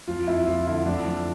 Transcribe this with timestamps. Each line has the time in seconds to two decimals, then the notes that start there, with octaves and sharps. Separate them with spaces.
0.08 F2 F4
0.27 F2 E4
0.47 F2 F4
0.67 D3 E4
0.86 F2 D4
1.05 F2